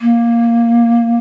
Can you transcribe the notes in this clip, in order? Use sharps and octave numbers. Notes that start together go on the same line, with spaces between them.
A#3